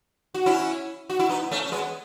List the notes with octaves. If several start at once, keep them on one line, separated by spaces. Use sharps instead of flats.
F#4
C#4 E4
F#4
E4
B3 D#4
A3 C#4
C#4
G#3 B3